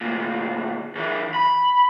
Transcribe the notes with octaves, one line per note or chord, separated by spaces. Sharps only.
D2 A#2
C#3 E3
B5